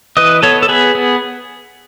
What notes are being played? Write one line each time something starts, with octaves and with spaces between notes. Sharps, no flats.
E3 B4 D#5
B3 A4 C#5
A4
B3 G#4 B4
B3